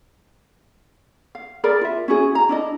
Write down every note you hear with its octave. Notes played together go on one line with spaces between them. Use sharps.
F5
G#4 A#4 D5 B5
F4 E5
C#4 E4 F#4 G#4
A#5
D4 E4 D#5